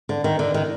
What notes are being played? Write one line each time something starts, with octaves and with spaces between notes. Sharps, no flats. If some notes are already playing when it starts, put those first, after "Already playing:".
D3
D#3
D3
D#3